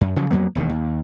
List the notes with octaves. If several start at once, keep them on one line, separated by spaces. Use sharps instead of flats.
F#2
C#3 F3 F#3
F2 F#3 A#3 B3
E1 D#2 D3 D#3
D#2